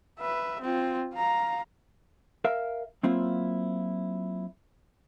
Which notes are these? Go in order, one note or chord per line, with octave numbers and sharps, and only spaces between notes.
B4 E5
C4 F4
F5 A#5
A#4 E5 F5
F#3 A#3 C4 E4 F4